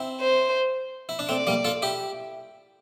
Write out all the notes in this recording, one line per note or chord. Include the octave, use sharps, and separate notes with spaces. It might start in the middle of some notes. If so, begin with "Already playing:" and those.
Already playing: C4 E4
C5
E4
D4
A3 C4 D5
G3 A#3
F4 A4
E4 G4